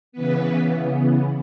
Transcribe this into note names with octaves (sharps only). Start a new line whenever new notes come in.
C#3 E3 B3 B4